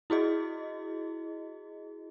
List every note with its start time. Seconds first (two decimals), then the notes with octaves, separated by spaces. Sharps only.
0.10 E4 F#4 G#4 D#5